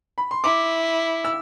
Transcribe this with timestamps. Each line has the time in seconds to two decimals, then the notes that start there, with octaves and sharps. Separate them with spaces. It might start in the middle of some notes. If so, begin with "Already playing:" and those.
0.18 B5
0.31 C6
0.44 E4 D6
1.25 E6